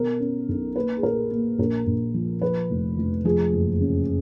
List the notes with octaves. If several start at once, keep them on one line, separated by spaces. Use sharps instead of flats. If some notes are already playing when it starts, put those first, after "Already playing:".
Already playing: B2 A#4
C#4
B1
A#3 B4
G#4
A#2 A#4
A#3
A#1 A#4
A#1
F3
F3 B4
F1
F1
F3 G#4
F#1
C#3